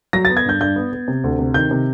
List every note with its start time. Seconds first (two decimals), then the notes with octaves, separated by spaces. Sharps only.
0.13 F#3 A#6
0.25 A6
0.30 B3
0.37 G#6
0.45 G2 G6
0.60 G2 G6
0.76 B3
0.93 B3
1.08 C3
1.24 D2
1.39 C3
1.54 D#3 G6
1.71 C3